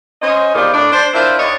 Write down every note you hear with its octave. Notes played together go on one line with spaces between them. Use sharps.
C#4 C5 D#5
E2 D#3 F3 G4 D5
A2 D4
D4 C5
D4 E4 F4 A#4 C5
D#2 D4 C#5 D#5